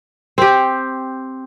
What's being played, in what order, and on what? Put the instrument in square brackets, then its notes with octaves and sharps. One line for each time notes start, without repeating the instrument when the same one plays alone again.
[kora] C4 G4